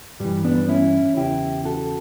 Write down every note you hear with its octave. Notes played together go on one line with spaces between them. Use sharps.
G2 E3 G3
B3 D4
C#4 E4
E2 C#3 E3 E4 G4
F#4 A4